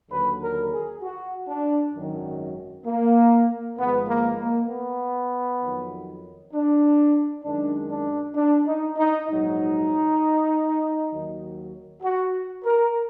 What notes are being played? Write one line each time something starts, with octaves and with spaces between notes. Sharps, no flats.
D#2 D3 F#3 B4
A#4
G#4
F#4
D4
G#1 F#2 D#3 F#3
A#3
G#1 G#2 F3 G#3 B3
A#3
A#3
B3
F2 D#3 F#3
D4
F#2 D#3 G#3 D4
D4
D4
D#4
D#4
A#1 G#2 F#3 D#4
D#2 D#3 F#3
F#4
A#4